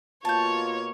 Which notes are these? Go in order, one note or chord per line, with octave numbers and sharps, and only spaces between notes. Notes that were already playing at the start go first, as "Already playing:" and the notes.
B2 A#3 F4 C#5 A5 G6